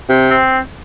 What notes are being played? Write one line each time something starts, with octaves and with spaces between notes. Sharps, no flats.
C3
C4